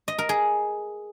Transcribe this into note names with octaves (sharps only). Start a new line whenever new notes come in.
D#5
A#4
G#4